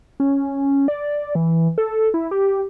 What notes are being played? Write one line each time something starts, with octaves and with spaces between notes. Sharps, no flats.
C#4
D5
E3
A4
E4
G4